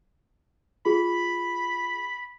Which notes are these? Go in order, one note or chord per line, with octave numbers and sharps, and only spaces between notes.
F4 G#4 B5